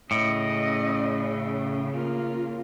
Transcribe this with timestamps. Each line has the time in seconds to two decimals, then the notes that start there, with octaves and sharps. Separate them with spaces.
0.11 A2 C#3 D#5
1.92 A#3 F4